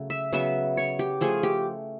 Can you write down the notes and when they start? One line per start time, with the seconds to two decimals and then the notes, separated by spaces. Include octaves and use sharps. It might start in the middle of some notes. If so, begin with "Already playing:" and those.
Already playing: C#3 F#3 A3
0.10 E5
0.32 C#3 F#3 B3 E5
0.77 C#5
0.99 G4
1.21 F3 A3 C#4 G#4
1.43 G4